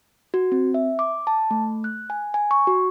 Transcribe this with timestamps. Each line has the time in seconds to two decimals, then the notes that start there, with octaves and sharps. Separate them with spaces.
0.34 F#4
0.52 C4
0.74 E5
0.99 D6
1.27 A5
1.51 A3
1.84 F#6
2.10 G#5
2.34 G#5
2.51 C#6
2.67 F#4